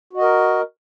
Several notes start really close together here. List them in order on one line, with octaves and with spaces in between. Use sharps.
F#4 D#5 A#4